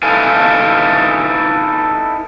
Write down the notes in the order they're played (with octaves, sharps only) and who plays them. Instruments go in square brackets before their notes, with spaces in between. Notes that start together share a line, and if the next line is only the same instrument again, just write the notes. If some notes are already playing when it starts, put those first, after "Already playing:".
[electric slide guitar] D#4 E4 A4 B4 F5 G#5